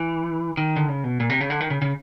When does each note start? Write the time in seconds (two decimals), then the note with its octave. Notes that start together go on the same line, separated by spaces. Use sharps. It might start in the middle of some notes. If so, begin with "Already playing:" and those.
Already playing: E3
0.57 D#3
0.76 D3
0.89 C#3
1.04 B2
1.20 A#2
1.30 C3
1.41 C#3
1.50 D3
1.60 D#3
1.70 C#3
1.82 C#3